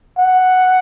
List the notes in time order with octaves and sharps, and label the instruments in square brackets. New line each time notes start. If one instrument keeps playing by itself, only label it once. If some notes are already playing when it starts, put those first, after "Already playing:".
[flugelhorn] F#5